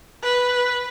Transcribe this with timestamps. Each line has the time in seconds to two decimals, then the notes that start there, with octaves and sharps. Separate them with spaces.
0.23 B4